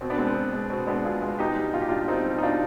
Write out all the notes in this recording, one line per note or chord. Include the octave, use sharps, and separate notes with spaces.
B2 C4
B3 D4
G#3 C4
B3
B2
G#3
B2 C4
G#3 B3 D4
B2 F4 G#4
G#3
B2 D#4 G4
G3
B2 F4
G4
G3 D4 F4
B2 C4 D#4
G3
D#4
B2 D4 F4